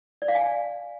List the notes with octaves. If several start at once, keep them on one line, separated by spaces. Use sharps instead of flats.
D5
F5
G#5